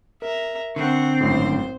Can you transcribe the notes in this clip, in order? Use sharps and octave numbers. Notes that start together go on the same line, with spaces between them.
A#4 E5 A#5
D3 C4 F#5 C#6
G#1 F#2 A2 C5 C6